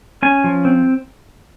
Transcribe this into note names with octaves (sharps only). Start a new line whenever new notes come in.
C#4 G#5
F3
C4